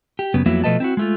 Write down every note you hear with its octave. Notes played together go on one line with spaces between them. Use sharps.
G4
F#2 C#3 B3
F2 F#3 A#3 B3 E4
B2 F3 A3 B4 D#5 A5
C4 E4 F#4
G#3 A3 F4